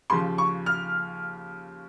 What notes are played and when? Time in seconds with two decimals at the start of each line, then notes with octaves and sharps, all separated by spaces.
0.10 D#2 C#3 F3 C6
0.38 C#6
0.66 F6